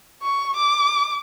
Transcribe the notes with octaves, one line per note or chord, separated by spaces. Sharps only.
C#6
D6